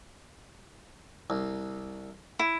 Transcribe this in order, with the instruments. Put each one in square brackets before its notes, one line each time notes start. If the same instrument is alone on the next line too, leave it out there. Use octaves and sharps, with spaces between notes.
[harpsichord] C2
[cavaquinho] E4